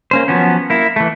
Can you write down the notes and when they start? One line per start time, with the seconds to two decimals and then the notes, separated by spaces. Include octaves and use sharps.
0.11 A#3 C#4 C5
0.28 F3 F#3 B3 C#4
0.70 A#3 E4
0.96 E3 A3